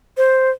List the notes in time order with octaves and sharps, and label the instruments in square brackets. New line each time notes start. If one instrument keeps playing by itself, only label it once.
[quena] C5